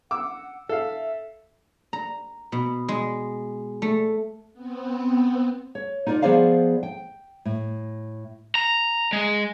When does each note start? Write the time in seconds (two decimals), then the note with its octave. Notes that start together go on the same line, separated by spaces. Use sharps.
0.11 F#5 D6 E6
0.69 A4 E5 F5
1.93 A#5
2.52 B2
2.89 G#3
3.82 A3
4.53 B3 C4
5.75 C#5
6.06 D#4 F4 A#4 C5 D5
6.22 F3 B3 G#4 C5 D5 F5
6.83 G5
7.45 A2
8.55 A#5
9.13 G#3